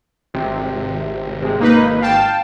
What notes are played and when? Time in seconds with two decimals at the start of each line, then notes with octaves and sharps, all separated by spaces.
0.34 G#1 C3
1.41 C3 G#3
1.59 A#3 D#4 B4
2.01 F5 G5 A5